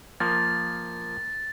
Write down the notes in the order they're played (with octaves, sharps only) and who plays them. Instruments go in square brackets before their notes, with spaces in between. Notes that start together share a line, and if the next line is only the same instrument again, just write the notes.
[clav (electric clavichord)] F3 A#3 [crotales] A6